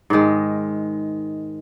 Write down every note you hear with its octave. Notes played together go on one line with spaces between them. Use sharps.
G#2 D#3 G#3